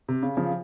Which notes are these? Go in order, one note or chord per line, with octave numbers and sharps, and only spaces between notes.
C3
C#3
C#3 F3